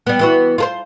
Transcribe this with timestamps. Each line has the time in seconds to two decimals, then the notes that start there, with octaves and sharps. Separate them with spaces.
0.07 G3 B3
0.19 E3 B3 F#4
0.58 F4 A4 C5